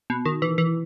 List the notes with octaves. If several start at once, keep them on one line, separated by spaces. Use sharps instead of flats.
B2
D#3
E3
E3